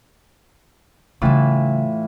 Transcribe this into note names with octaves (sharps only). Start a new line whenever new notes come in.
A2 C#3 E3 G3 F4